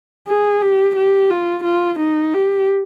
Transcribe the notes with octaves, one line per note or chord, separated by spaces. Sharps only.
G#4
G4
G4
F4
F4
D#4
G4